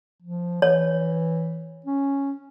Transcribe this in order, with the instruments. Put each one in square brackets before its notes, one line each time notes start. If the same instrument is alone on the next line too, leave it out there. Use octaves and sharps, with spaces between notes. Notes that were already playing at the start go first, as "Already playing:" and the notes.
[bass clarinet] F3
[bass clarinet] E3 [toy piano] C#5
[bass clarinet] C#4